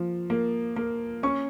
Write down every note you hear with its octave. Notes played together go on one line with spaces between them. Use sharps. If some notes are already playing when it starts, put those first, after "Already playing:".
Already playing: F3 A#3
A#3
A#3
C#4 C#6